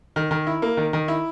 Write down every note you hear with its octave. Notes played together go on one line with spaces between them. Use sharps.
D#3
D#3
E4
A#3
D#3
D#3
E4